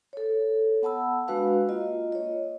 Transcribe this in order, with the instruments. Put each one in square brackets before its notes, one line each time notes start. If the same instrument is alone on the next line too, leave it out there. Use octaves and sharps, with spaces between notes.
[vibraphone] A4 C#5
B3 F#5 A5 B5 E6
G#3 D4 F#4 B4 F5
A#3 F4 D#5
C#5 D#5